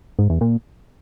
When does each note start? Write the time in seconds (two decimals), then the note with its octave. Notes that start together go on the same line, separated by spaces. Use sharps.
0.19 G#2
0.30 E2
0.41 A#2